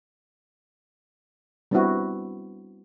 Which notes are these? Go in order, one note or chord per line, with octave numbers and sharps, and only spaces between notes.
G3 B3 C4 D4 E4 F#4